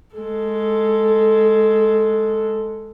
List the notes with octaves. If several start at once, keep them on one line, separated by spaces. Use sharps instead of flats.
G#3 A4